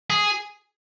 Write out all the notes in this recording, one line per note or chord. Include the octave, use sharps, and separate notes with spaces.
G#4